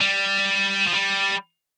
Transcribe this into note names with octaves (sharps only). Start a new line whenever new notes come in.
G3
F3
G3